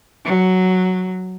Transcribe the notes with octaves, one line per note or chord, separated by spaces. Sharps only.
F#3